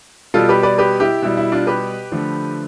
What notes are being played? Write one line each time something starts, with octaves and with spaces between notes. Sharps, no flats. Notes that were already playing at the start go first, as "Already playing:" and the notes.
B2 G3 F4 A4
G4 B4
B4 D5
G4 B4
E4 G4
B2 G3 E4
E4
D4 F4
G4 B4
D3 F3 A3